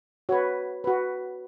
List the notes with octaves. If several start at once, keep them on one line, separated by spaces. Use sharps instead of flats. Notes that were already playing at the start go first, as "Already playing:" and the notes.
F#4 B4 C#5
F#4 B4